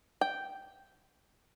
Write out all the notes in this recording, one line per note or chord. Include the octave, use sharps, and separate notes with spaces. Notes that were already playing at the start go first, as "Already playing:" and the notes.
G5